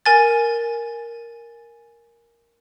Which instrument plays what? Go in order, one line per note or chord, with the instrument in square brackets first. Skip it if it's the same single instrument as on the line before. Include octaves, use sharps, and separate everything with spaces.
[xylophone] A#4 G#5 A6